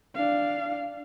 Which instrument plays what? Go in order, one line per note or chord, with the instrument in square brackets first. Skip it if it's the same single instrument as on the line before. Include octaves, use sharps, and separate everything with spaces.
[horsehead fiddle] D4 F5